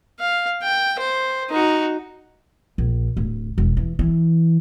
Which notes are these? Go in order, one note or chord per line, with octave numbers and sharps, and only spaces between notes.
F5
G5
C5
D#4 F#4
A#1
D1
E1
E3
E3